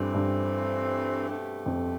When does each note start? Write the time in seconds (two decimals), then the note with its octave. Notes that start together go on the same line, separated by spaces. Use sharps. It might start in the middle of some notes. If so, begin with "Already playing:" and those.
Already playing: G2 E3 A3 C4
0.14 G2
1.28 B2 A3 C4 G4
1.66 F2